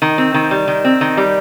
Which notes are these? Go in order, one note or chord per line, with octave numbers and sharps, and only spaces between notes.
D#3
C4
D#3
G3
D#3
C4
D#3
G3